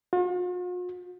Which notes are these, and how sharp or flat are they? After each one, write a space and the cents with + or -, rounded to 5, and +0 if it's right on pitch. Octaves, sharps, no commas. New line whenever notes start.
F4 +45